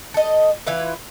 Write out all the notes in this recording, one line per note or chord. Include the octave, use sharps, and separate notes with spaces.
A4 D#5
E3 E4 F4 B4